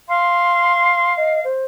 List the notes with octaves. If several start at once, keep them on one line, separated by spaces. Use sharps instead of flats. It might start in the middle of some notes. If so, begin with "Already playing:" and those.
F5 C6
D#5
C5